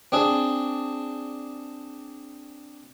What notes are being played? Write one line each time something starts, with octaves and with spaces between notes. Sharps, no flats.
C4 D4 G#4